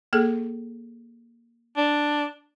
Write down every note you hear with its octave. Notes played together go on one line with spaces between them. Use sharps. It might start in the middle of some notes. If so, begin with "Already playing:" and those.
A#3 G#4 A4
D4